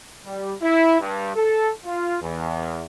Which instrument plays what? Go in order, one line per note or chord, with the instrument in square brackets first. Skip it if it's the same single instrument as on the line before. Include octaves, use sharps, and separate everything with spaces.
[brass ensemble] G3
E4
G2
A4
F4
E2